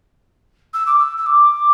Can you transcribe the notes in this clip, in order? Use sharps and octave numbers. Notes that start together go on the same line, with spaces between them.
E6
D6
E6
E6
D6